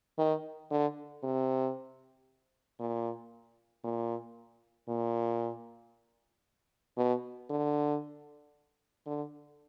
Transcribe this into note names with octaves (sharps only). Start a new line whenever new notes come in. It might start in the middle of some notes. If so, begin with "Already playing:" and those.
D#3
D3
C3
A#2
A#2
A#2
B2
D3
D3